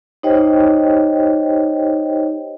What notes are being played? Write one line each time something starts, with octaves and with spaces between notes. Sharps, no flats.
D#4 G4 C5 C#5 D#5 G5